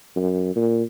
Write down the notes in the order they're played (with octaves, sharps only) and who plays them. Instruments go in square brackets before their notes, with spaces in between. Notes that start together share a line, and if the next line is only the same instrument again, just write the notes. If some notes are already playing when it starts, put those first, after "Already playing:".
[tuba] F#2
A#2